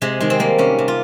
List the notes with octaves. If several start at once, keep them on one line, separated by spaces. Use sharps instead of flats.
C3 G#3
D#3 G#3
C4
G3 A#3
C3 C#4
C3
F4